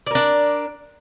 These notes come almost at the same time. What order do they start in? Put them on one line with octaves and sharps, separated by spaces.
D5 A#4 D4